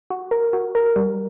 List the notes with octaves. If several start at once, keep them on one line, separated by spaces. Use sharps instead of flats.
F#4
A#4
F#4
A#4
G3